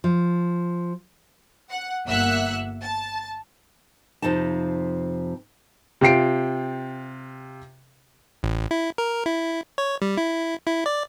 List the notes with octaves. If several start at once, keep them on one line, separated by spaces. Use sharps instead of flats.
F3
F#5
G1 A#3 E5 F#5 E6 F#6
A5
F2 C3 F3 D#4 A5
C3 F4 G5 C7 D7
A1
E4
A#4
E4
C#5
G3
E4
E4
D5